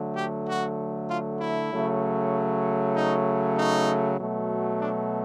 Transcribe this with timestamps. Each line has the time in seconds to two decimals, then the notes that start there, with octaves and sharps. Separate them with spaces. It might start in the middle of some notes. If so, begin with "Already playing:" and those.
Already playing: D3 F#3 A3
0.16 G4
0.48 F#4
1.09 F4
1.40 E4
1.71 C#3 F#3 A3
2.95 D#4
3.57 D#4
4.19 B2 F#3 A3
4.81 D4